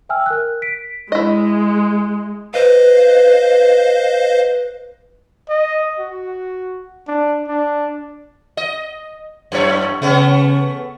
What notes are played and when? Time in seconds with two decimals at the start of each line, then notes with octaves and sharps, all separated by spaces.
0.09 E5 G5 G#5 E6 F6
0.26 A#4 F#6
0.62 B6 D7
1.12 G#3 E4 D#5
2.54 B4 C5 D#5 F5
5.49 D#5
6.00 F#4
7.08 D4
7.48 D4
8.57 D#5
9.52 F#2 A2 C#5
10.02 C#3 A3 B3 C#4